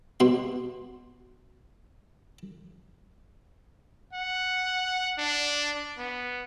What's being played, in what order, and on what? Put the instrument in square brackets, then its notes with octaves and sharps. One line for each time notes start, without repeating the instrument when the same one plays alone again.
[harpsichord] B2 C6
[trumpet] F#5
D4
B3